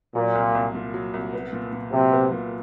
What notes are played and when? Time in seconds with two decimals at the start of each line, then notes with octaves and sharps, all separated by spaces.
0.15 A#2 F#3
0.35 C2
0.55 C2
0.75 A#2
0.94 F#3
1.14 C2
1.33 B3
1.53 A#2
1.73 A#2
1.92 C3 F#3
2.12 B3
2.31 A#2